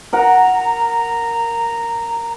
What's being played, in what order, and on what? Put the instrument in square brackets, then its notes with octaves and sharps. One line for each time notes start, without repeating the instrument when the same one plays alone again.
[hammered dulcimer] A#4 F#5 [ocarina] A#5